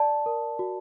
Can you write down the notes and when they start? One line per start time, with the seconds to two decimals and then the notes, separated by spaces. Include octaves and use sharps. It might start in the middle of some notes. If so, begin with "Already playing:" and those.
Already playing: D5 A5
0.26 A#4
0.59 F#4